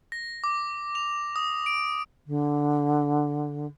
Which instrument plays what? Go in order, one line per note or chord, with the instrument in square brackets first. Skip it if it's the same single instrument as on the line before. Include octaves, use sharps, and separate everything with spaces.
[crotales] A#6
D6
F7
D#6
D7
[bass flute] D3